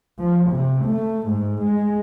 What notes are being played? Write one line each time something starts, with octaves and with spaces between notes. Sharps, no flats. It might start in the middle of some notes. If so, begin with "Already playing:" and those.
F3
C3
A3
G#2
G#3